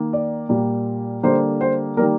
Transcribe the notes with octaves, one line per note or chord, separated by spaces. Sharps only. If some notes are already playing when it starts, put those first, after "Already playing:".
Already playing: D#3 A#3
D5
A#2 G3 A#3
D3 G3 A#3 C5
C5
D#3 G3 A#3 A#4